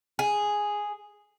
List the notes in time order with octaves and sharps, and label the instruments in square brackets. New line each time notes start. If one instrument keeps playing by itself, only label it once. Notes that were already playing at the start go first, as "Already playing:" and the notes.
[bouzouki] G#4